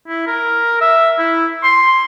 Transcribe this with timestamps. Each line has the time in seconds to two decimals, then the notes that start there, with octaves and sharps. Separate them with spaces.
0.08 E4
0.27 A#4
0.81 E5
1.19 E4
1.64 C6